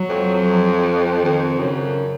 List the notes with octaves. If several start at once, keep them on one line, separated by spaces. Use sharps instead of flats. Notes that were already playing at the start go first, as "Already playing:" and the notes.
Already playing: F#3
F2
F3
F2 D#3
F#2 C#3